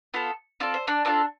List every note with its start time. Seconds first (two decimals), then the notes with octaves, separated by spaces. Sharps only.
0.14 B3 F4 A4
0.60 C4 F4 A4 D5
0.74 C5
0.87 D4 D5
1.05 C4 D4 F4 A4 D5